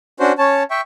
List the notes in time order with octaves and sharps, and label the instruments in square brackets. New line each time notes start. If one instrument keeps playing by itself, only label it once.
[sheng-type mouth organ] C#4 D4 F#4 C5
C#4 C#5 A5
E5 G5 C#6